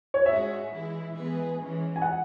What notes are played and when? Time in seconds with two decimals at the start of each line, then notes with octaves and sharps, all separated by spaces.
0.14 C#5
0.26 G#2 G#3 C#4 F#4 E5
0.70 E3 G#3 E4
1.14 E3 G#3 B3 G#4 B4
1.58 E3 G#3 C#4
1.96 G#5
2.02 F#5